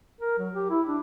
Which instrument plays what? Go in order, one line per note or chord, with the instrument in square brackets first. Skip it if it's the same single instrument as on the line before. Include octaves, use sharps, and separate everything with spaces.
[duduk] A#4
F#3
G4
E4
D4